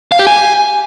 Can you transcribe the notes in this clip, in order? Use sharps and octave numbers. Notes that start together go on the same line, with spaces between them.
F5
G4
G#5